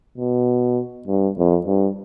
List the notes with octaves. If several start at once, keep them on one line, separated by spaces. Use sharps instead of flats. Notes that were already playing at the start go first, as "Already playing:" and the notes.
B2
G2
F2
G2